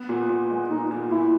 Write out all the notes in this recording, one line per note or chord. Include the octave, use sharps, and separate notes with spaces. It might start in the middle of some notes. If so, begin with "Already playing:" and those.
Already playing: B3
A#2
A#2
G#3
A#2 D#4
A#2
A#2 E4